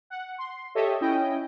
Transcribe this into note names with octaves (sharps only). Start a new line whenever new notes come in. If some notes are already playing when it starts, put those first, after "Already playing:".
F#5
C6
G4 A4 C#5 D#5 E5
C#4 E4 D#5 G5